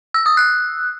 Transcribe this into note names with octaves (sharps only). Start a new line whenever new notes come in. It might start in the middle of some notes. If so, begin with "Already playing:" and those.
E6
D#6
F#6